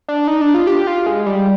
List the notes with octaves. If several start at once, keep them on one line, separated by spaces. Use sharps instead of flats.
D4
D#4
D4
F4
G4
F4
G#3
G3